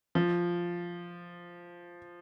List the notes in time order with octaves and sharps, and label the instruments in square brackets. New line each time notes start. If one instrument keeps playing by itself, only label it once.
[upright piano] F3